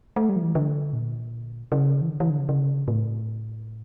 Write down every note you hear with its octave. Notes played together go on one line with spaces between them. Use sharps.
A3
G3
F3
E3
D3
A#2
C#3
E3
D3
E3
D3
C#3
C#3
A2